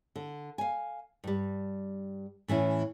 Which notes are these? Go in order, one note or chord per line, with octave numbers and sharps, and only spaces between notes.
D3
F5 G#5
G2 G3
A2 E3 C#4 E4